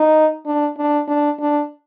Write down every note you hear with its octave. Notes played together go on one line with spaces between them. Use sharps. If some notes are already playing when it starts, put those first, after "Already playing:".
Already playing: D#4
D4
D4
D4
D4